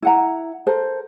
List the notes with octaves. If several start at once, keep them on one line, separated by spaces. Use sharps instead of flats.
E4 F#5 A#5
A4 A#4 C5